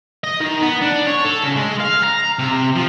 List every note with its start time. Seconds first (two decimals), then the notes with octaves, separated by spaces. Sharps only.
0.24 D#5
0.40 D#3
0.62 B3
0.82 D4
1.07 C#5
1.25 A4
1.43 C#3
1.56 G#3
1.80 F5
2.04 A#5
2.39 C3
2.75 F3